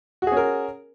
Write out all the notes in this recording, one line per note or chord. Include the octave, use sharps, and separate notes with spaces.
C#4 F#4 G#4 A#4